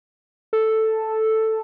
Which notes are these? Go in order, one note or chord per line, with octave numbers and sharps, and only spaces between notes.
A4